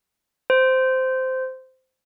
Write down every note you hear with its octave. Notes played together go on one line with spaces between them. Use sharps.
C5